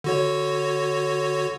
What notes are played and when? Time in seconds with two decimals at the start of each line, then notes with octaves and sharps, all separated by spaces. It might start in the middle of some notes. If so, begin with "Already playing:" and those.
0.04 D3 F#4 C#5